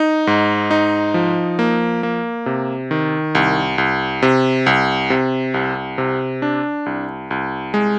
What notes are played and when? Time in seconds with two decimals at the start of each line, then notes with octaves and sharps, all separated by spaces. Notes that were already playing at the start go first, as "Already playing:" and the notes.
Already playing: D#4
0.27 G#2
0.71 D#4
1.14 F3
1.59 A#3
2.03 A#3
2.46 C3
2.91 D#3
3.35 C2
3.78 C2
4.22 C3
4.66 C2
5.10 C3
5.54 C2
5.98 C3
6.42 D4
6.86 C2
7.31 C2
7.74 G#3